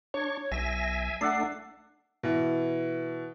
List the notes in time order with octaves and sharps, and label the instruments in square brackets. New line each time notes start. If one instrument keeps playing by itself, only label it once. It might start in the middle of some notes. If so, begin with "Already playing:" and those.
[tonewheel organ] D4 C#6 [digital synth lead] C#5
[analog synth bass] B1 [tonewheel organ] E5 G#5 [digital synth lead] A#6
[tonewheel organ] A3 D4 [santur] D5 E5 F#5 [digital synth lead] C7
[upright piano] B2 E3